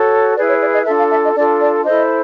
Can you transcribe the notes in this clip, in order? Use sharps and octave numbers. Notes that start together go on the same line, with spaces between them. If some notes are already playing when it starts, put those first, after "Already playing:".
Already playing: F#4 A4 C#5
E4 G#4 B4 D5
C#5
D5
D#5
D4 F4 A4 E5
F5
E5
D#5
D4 F4 A4 D5
D5
E4 A4 C5 D#5